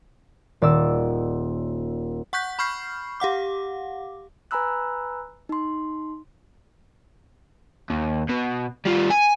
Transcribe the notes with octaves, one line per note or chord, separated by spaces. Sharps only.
D#1 D5 E6
F#5 C#6 F#6 G6 B6
B5 C#6 F6 G6 C7
G4 F5 F#5 D6
B4 G#5 A#5 B5 E6 F#6
D#4 C6
D#2
B2
G3 F4
G#5